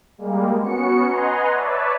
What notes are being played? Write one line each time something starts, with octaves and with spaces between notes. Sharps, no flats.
G3 G#3 A#3
B3 C#4 F#4 C#7
B4 D#5 F#5 G#5 A#5 C6
B4 C#5 D5 E5 A5